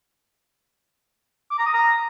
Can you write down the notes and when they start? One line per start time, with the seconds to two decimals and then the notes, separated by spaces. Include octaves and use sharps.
1.51 D6
1.58 A#5
1.66 D#6
1.73 A#5